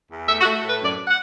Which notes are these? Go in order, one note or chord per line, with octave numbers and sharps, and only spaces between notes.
E2
A3 E5
F#4
A3
A2 B4
F#2 D5
F#5